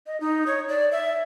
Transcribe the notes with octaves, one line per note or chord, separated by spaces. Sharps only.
D#5
D#4
C#5
D5
E5